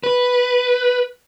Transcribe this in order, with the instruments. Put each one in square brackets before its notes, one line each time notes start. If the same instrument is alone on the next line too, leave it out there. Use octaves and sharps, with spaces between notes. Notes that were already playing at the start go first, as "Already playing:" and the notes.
[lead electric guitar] B4